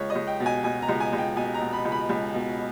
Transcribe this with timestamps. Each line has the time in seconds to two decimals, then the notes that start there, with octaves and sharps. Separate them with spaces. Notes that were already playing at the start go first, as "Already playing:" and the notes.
Already playing: C#2 C#5
0.10 D#5
0.15 C#2
0.27 G5
0.40 B2
0.46 G#5
0.64 B2 G#5
0.82 A#5
0.89 C#2
1.00 G#5
1.13 C#2
1.18 G5
1.36 B2 G#5
1.54 A#5
1.61 B2
1.73 B5
1.85 C#2
1.92 B5
2.09 C#2
2.34 B2